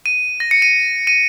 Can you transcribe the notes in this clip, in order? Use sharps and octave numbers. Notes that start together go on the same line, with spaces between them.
D#7
A#6
C#7
D#7
D#7